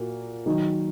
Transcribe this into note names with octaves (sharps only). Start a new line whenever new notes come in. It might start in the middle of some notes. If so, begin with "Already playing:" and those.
Already playing: A#2 A#3 F#4
D#3 F#3 D#4